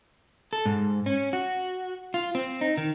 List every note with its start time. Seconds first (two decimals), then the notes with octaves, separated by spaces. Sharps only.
0.53 A4
0.66 G#2
1.06 C#4
1.33 F#4
2.14 F4
2.35 C4
2.61 D#4
2.78 D#3